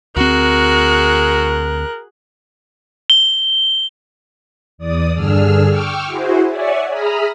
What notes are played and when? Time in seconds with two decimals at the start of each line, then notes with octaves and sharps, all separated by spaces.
0.17 D2 C4 F#4 G#4 A#4 F#6
3.10 G7
4.78 E2 D5 D#6
5.14 G2 D3 D4 G#4 E6 F6
5.68 G5 C#6 D6 E6 F6
6.06 E4 F#4 G#4 C5
6.47 C#5 D5 E5 F#5 G#5
6.89 G#4 E5 A#5 B5 D#6 F6